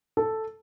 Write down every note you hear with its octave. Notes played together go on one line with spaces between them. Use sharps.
A4